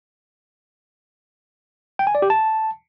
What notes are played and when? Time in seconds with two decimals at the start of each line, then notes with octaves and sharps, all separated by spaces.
1.99 G5
2.07 G#5
2.15 D5
2.22 G4
2.30 A5